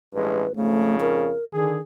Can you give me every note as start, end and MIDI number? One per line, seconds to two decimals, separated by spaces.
0.14 0.44 33
0.14 0.44 43
0.14 0.44 56
0.14 0.52 71
0.55 1.31 41
0.55 1.31 44
0.55 1.31 49
0.55 0.95 57
1.01 1.44 70
1.53 1.77 50
1.53 1.80 51
1.53 1.77 68